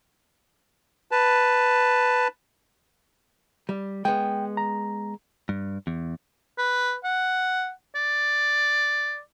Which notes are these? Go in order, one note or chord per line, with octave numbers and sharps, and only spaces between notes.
B4 A5
G3
G#3 B3 G5
A#5
G2
E2
B4
F#5
D5